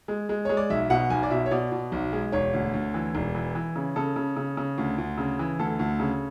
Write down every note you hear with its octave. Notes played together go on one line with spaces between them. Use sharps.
G#3
G#3
G#3 C#5
D5
B1 E5
B2 F#5
B1 G#5
D5
B2 E5
C#5
B2 D5
B2
B1
G#3
E1 C#5
D2
D2
E3
E1
E3
E3
C#3
C#3 A4
C#3
C#3
C#3
D2
D2
C#3
E3
D2 A4
D2
C#3